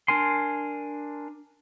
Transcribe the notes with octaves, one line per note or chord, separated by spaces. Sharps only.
D4 A#4 G#5 C6